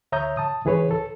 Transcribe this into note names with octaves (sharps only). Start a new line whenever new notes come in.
D2 C#5 E5 A#5 D#6 G6
A5 D#6
C#2 E3 G#4 B4 C#5
A4